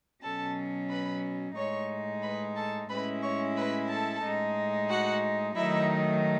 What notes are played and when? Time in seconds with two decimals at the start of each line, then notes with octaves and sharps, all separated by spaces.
0.23 B2 F#3 C#4 A4 A5
0.90 B4 B5
1.56 A2 G#3 D#4 C#5 C#6
2.22 B4 B5
2.56 A4 A5
2.89 A2 G#3 C#4 E4 B4 B5
3.22 C#5 C#6
3.57 B4 B5
3.89 A4 A5
4.23 A2 G#3 D#4
4.89 F#4 F#5
5.56 D#3 F#3 A3 D#4 E4 E5